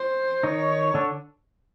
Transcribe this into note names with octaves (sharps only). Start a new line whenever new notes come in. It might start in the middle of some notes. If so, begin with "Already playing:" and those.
Already playing: C5
D#3 D#4 C#5
D3 D4